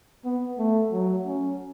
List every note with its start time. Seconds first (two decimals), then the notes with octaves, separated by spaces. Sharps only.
0.25 B3
0.58 A3
0.92 F#3
1.26 C#4